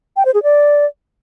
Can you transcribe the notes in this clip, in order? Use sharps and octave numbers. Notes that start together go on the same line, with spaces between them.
G5
C5
G#4
D5